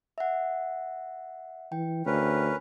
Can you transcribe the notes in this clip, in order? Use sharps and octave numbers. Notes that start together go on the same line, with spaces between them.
E5 F#5
E3 G5
D2 C#4 A#4 B4